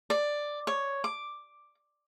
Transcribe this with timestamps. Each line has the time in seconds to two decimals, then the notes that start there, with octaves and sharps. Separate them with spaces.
0.10 D5
0.67 C#5
1.04 D6